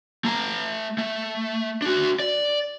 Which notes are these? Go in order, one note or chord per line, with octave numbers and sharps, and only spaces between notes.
A3 A#5
A3
D4 F#4
D5